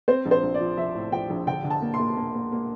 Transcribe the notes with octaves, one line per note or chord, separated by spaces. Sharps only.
C4 C5
A#1
C5
A#1
D5
F3
F3 E5
A2
F3 G5
A#1
D3 G5
D3
A5
A#3
C6
A#3
A#3
A#3
A#3